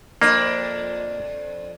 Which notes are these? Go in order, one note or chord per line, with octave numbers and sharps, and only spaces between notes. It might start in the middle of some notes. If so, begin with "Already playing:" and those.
F2 A#3 D4